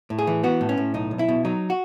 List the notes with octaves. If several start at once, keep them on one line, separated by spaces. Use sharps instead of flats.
A2
G#4
E3
B3 F#4
A2
C#4
A2
B1 D#4
B1
E4
B2
F#3 D#4
F#4